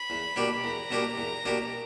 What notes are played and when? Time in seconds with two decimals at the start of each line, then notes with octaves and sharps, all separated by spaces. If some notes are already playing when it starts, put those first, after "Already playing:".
Already playing: B5
0.10 E2
0.36 B2 A#3 D4 G4
0.63 E2 A#5
0.91 B2 A#3 D4 G4
1.17 E2
1.45 B2 A#3 D4 G4